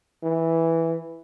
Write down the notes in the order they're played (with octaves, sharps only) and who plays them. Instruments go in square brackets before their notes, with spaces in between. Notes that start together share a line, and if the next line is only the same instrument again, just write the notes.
[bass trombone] E3